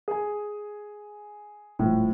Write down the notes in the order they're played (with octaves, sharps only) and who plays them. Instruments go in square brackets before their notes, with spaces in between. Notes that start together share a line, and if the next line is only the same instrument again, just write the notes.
[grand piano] G#4 G#5
[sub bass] D#1 [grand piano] A2 F3